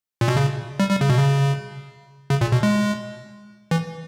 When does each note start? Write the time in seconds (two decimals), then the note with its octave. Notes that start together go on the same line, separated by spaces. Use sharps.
0.21 A#2
0.28 B2
0.37 C#3
0.80 G3
0.90 G3
1.01 C#3
1.10 B2
1.18 C#3
2.30 C#3
2.41 A#2
2.52 B2
2.63 G#3
3.71 E3